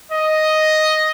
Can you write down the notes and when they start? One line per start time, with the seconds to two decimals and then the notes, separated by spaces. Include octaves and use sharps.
0.12 D#5